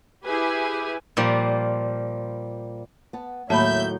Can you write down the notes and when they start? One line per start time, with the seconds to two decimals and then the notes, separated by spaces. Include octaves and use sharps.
0.25 E4 G4 G#4 B4 G#5
1.17 A#2 F3 G3
3.13 B3 A5
3.50 D#2 A2 F#3 E5 A5 B5 G6